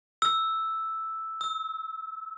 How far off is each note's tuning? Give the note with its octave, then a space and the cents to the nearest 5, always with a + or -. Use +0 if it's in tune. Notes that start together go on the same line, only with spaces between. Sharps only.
E6 +0
E6 -30